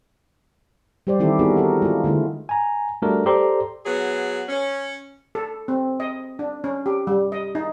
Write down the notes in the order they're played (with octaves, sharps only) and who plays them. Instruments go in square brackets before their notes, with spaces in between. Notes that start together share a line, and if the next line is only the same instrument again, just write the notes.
[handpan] G3 G4 C5 D5
D#3 E3 C4 E4 G4 A4
B3 D4 D#4 F#4 G#4 A#4
F#4 A4 A#4
G#3 F4
D3 G#3 A3 E4
[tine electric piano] G#5 A#5
G3 A3 D4 F#4 A4 A#4
G4 A4 C5 D5 A#5 C6
[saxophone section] F#3 B3 G#4
C#4
[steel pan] A4
C4
D#5
D4
C#4
G4
G3
D#5
D#4